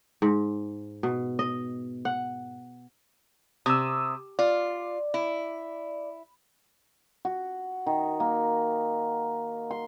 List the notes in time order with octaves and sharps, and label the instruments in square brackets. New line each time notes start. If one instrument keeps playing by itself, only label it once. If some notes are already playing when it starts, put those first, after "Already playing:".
[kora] G#2
B2
D#5
F#5
[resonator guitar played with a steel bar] C3 [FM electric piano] D#6 E6
[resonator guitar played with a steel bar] F4 [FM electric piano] D5
[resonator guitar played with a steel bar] E4
[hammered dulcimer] F#4
D#3
A#3
C6